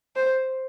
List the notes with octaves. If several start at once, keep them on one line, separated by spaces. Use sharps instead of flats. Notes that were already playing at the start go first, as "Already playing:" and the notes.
C5